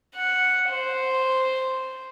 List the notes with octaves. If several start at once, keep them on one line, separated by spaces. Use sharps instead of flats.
F#5
C5